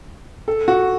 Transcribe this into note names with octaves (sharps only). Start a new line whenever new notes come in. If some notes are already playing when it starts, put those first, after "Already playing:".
A4
F#4